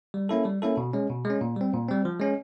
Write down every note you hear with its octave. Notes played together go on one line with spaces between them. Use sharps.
G3
A#3 C#4 E4 A4
G3
A#3 C#4 E4 A4
B2
G#3 C#4
B2
G#3 C#4
A#2
G3 C4
A#2
G3 C4
F3
G#3 C#4